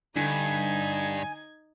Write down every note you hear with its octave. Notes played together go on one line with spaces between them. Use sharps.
G2 D3 D#4 G#5 G#6